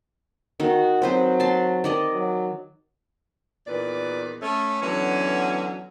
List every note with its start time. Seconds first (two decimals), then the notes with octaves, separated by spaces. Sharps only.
0.60 D#3 D#4 F#4
1.02 F#3 C4 B4 C5
1.40 A5 C6
1.84 D#3 D5 D#5
2.12 F#3
3.67 E2 A#2 D#3 B4 D5
4.42 A3 C#4
4.81 D3 E3 F#3 B3 C#4